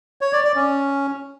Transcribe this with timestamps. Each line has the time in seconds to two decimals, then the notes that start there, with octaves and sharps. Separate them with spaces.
0.21 C#5
0.33 D5
0.44 D5
0.56 C#4